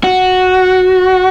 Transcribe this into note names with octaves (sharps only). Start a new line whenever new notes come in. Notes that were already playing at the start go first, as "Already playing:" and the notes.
F#4